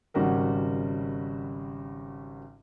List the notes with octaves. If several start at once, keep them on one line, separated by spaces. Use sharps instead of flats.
G#1 C#3 G3 F#4 A#4